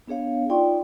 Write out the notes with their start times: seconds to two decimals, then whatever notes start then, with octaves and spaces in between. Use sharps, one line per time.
0.07 B3 D4 G#4 C#5 F5
0.49 D#4 F4 D5 G5 C6 C#6